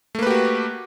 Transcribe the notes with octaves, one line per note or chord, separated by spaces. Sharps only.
A3 A#3 F#4 G4 B4